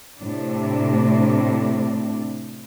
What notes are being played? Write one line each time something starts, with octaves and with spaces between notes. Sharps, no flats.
A2 C3 D4